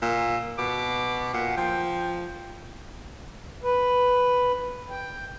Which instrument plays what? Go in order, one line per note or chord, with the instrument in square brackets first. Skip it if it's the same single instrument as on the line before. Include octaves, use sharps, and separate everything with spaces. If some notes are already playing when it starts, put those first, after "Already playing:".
[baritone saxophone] A#2 [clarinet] E6
[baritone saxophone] B2 [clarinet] D6
[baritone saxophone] A#2 [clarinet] F#5
[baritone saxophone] F3 [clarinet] G5
[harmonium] B4
G5